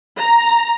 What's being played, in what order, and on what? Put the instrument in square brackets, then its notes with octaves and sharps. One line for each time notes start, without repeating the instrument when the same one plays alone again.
[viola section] A#5